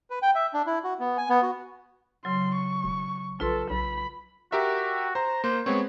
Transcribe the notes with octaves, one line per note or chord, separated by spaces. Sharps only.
B4
G5
E5
D4
E4
F#4
B3
G#5
B3
F#4
C#3 F#3 C6
C#6
E1
A#1 F4 A4 B4 C6
B1 B5
F#4 G4 A#4 E5
C5 A#5
A#3 C5
G#3 B3 C4 C#5